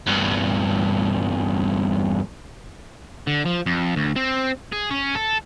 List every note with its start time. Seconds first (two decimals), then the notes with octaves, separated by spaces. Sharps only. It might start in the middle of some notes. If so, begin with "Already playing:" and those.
0.07 E2 G2
3.27 D3
3.46 F3
3.66 F2
3.96 D2
4.16 C4
4.73 G#4
4.91 C#4
5.15 A4